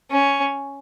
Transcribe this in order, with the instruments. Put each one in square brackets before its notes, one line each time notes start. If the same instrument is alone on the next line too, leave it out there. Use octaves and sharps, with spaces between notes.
[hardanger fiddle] C#4